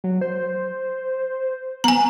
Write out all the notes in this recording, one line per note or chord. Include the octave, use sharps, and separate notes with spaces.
F#3
C5
B3 G#5 A#5